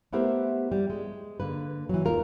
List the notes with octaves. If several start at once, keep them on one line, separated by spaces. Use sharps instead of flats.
A3 B3 E4 G4 A#4 C5
G3
G#3
D3 A#3 B4
E3 F#3
D#2 F4 A#4